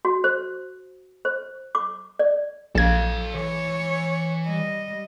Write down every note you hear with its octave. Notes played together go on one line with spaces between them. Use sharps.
F#4
C5
C5
D6
D5
A#1 A4 F5 G#6
E3 C#5
G3 D#5